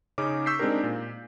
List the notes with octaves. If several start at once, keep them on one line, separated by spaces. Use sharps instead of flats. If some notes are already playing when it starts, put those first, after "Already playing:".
C#3 C#4 D#4 D6
C#6 E6 G6 B6 C7
G#3 C4 D4 D#4 G4 A#4
A#2